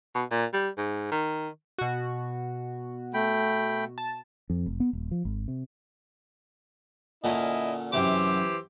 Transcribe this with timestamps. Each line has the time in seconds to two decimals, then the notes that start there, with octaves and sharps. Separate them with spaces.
0.15 B2
0.31 A#2
0.54 G3
0.78 G#2
1.12 D#3
1.78 B2 F#4
3.14 A3 G5 B5
3.98 A5
4.50 F2
4.66 F1
4.80 B3
4.93 D#1
5.11 F3
5.25 G#1
5.48 C3
7.24 A#2 D3 C#4 E4 D#5
7.92 F#2 C3 E3 G4 C5 D6